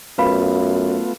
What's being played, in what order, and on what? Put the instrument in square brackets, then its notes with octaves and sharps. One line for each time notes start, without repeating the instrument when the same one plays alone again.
[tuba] F#2 [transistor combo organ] A3 B3 F4 [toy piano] B4 F5 B5